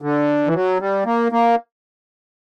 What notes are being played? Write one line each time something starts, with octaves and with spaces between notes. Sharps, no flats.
D3
E3
F#3
G3
A#3
A#3